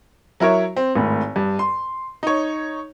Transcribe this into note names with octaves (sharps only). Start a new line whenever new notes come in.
F#3 E4 A#4 C#5 E5
C4
G#1 A2
G2
C6
D#4 C#5